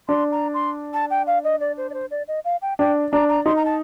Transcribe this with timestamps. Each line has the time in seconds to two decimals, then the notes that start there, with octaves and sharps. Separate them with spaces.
0.08 D4 C6
0.32 A#5
0.54 C6
0.94 A5
1.11 G5
1.27 F5
1.44 D#5
1.60 D5
1.77 C5
1.90 D5
1.94 C5
2.11 D5
2.28 D#5
2.45 F5
2.62 G5
2.79 D4 G5
3.13 D4 A#5
3.29 A#5
3.46 D#4 C6
3.56 A#5
3.65 A5